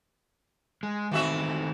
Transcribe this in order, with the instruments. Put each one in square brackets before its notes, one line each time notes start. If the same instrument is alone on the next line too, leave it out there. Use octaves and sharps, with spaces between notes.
[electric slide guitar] G#3
[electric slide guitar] D#3 A3 C4 [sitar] E3 F#4 E5